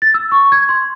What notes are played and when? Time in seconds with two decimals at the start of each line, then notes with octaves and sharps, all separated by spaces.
0.02 A6
0.14 E6
0.32 C#6
0.52 G#6
0.69 C6